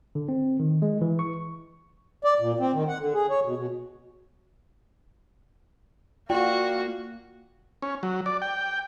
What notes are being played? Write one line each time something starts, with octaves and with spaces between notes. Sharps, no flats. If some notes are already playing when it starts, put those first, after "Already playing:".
D3
C4
D#3
G#3
E3
C#6
D5
A#2
C4
D#3
F#5
D3
G#4
C#5
B2
B2
A#3 F4 F#4 D5 G5
C#4
F#3
D5
G5